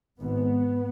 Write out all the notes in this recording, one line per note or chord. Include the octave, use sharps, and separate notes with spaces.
G#1 G#2 B3